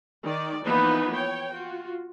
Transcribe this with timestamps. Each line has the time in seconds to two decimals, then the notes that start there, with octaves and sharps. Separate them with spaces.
0.24 D#3 D5
0.66 E3 F3 A#3 B3 D#4 B4
1.16 C#5 G5
1.52 F4 F#4